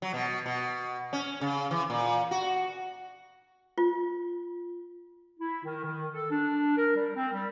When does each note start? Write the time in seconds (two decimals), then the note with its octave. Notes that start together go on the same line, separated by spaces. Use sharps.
0.02 F#3
0.14 B2
0.46 B2
1.13 C#4
1.41 C#3
1.71 E3
1.90 A#2
2.31 F#4
3.78 F4
5.39 E4
5.64 D#3
5.84 D#3
6.13 A4
6.30 D4
6.77 A#4
6.95 G3
7.16 C4
7.32 G3